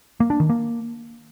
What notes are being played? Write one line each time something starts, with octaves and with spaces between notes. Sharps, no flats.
A#3
D4
D#3
A#3